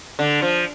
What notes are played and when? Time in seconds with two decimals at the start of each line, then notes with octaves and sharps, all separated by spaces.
0.19 D3
0.42 F3